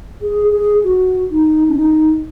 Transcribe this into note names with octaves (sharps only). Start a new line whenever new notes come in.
G#4
G#4
F#4
D#4
C#4
D#4